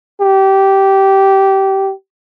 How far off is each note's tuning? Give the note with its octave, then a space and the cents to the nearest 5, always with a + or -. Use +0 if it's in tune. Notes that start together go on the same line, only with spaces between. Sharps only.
G4 -15